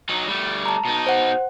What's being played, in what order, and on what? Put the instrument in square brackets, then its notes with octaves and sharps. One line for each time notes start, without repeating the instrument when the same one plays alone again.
[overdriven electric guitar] F#3 D#4
G3 A3
[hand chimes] A5 A#5
[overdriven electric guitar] B2 D#4
[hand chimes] C5 F#5